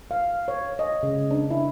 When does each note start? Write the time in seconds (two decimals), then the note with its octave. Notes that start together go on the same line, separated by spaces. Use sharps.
0.11 F5
0.48 C#5
0.79 D#5
1.03 C#3
1.31 D4
1.51 E4